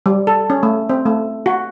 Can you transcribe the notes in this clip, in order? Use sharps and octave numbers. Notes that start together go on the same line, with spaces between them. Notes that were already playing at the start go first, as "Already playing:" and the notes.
G3
A4
C#4
A3
C4
A3
F#4